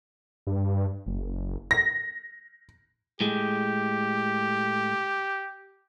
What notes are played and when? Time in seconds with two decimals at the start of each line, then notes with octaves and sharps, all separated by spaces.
0.47 G2
1.06 F#1
1.71 A#6
3.21 A2 G#3 G4